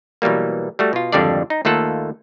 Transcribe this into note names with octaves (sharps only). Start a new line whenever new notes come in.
B2 E3 F#3 G3 A#3
G3 A3 F#4
B2 F4
G#1 F2 D3 G3 D4 D5
D#4
D#2 A3 A#3 F4 A4 F#5